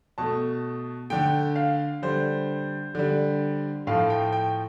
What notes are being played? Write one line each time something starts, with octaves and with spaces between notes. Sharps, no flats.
B2 A3 A5
D3 A3 G5
F5
D3 G3 C5
D3 G3
A2 F3 A3 F5
G5
G5